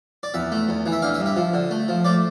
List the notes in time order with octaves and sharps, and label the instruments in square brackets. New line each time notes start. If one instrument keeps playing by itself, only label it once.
[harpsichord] D5
E2 E5
A3
E2
E3
E5
D3 F5
E5
G2
E5
F3
D3
A3
F3
A3 D5